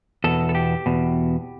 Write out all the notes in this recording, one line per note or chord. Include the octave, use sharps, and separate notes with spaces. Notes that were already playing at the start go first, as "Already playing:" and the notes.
E2 B2 A4
A4
G4
E2 B2